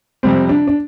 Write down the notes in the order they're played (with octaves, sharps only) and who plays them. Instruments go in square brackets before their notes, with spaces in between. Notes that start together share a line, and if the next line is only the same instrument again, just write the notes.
[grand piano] F2 C3 G3 [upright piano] C4
[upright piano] D4
D4